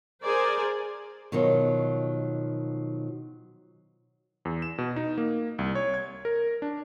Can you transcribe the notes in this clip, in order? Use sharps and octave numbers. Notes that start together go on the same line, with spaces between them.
G#4 A#4 C5 D5 G#5
B2 D#3 F3 F#3
E2
E7
B2
D#4
A#3
C2
C#5
G#6
A#4
D4